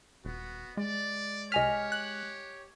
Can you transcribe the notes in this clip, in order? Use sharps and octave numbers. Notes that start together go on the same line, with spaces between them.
D#1 B3 F#4
G#3 D5
C2 G4 C#5 D#5 G#5 F6 B6
F#6